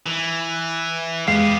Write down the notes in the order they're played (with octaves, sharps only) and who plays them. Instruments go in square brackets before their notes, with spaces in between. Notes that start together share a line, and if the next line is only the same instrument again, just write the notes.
[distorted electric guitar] E3
[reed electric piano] E2 G#3 F5 [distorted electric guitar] B3 G4 [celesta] C7